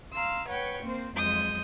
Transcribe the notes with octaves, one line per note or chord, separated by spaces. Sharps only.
F5 A#5 C6 E6
B4 C#5 F#5 G5 C#6
A#3 C4 C5
F2 F#3 G#3 D#6 G6